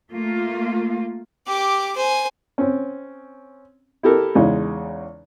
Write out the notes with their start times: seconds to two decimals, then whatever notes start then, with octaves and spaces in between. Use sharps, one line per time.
0.11 A3 A#3 F4
1.47 G4 D6
1.96 C5 G#5
2.58 C4 C#4
4.03 E4 G4 A4 A#4
4.35 E2 C#3 G#3 D#4